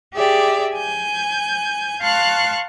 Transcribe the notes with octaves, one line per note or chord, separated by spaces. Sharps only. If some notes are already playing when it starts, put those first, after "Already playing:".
G4 G#4 D5 E5
G#5 G6
F5 A5 C6 C#6 F6 F#6